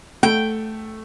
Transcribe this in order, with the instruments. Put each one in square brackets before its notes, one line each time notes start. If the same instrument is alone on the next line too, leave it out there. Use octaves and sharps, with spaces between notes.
[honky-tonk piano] A3 [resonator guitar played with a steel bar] G5